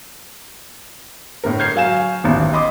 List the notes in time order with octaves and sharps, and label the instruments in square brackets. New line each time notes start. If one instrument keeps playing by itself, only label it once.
[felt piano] A2 D3 A#4
F6 G6 G#6 C7
F#3 F5 G#5 E7
A1 D#2
D#5 B5 C6 D6 D#6